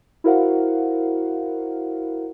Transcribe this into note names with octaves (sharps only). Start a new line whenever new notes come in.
E4 F#4 A#4 C5 F5 F#5